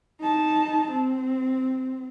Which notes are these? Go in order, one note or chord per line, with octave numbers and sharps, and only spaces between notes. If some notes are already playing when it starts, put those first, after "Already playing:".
D#4 A5
C4